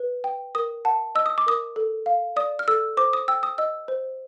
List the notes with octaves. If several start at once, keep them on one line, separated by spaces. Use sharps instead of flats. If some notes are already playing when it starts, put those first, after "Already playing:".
Already playing: B4
G5
A#4 D#6
F#5 A5
D#5 E6
D#6
D6
A#4 D#6
A4
F5
D5 D#6
F6
A4 E6
C5 D6
D#6
G5 E6
D#6
D#5 E6
C5